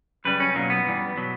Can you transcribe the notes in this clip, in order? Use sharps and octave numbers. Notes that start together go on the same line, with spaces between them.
F#2 C#3 G3 B4
C#4
B1 A#2 F#3 A#3
B3
G2 E3 G3
B2 F#3